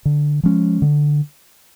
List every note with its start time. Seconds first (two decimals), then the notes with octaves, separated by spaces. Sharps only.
0.05 D3
0.43 F3 G#3 C#4
0.82 D3